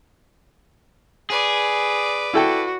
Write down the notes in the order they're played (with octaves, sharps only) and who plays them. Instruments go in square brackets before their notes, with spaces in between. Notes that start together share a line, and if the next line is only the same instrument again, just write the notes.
[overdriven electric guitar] G#4 [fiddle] B4 D5
[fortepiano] E4 A4 G5 [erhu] F#4